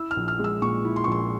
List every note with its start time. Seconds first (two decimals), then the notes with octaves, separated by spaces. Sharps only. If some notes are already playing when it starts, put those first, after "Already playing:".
Already playing: E4 E6
0.11 F6
0.16 A#1
0.28 F6
0.39 G#3
0.44 E6
0.62 A#2 C#6
0.85 E4
0.96 C6
1.04 C#6
1.07 A#1 C6